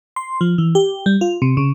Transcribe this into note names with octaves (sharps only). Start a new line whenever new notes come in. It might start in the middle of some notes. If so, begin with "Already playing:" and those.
C6
F3
E3
G4
G3
F4
C3
C#3